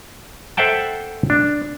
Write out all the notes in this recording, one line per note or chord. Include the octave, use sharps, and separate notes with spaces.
A4 C5 E5 F#5 G5 A5
D4